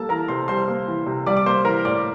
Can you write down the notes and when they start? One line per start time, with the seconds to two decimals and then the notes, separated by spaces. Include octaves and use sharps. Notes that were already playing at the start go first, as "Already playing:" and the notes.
Already playing: G3 A#3 A4 A5
0.09 E3 A#4 A#5
0.28 C3 C5 C6
0.48 G3 C5 C6
0.68 A#3
0.87 E3
1.07 C3
1.26 G3 D5 D6
1.37 D6
1.46 A#3 C5 C6
1.65 E3 A#4 A#5
1.85 A2 D5 D6